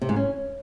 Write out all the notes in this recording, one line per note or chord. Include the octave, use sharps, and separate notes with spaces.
C3
G#2
C#4